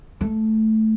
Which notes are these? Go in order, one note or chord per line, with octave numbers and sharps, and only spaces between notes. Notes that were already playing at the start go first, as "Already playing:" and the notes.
A3